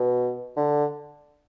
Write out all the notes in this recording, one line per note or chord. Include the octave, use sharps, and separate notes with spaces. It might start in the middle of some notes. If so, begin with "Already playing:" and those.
Already playing: B2
D3